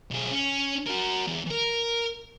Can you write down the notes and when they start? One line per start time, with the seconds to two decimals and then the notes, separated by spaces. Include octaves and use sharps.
0.11 B1 G#4
0.31 C#4
0.87 F#4 A#4
1.27 E2
1.51 A#4